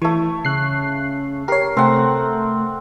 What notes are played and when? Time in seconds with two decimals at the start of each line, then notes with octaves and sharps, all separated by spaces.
0.02 E3 A3 C#5
0.45 C#3 F#6 C7
1.48 G4 A#4 C#5 C7
1.77 C3 A3 C4 F#5